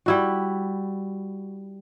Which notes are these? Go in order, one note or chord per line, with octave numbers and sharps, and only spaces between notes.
G3 E4 F#4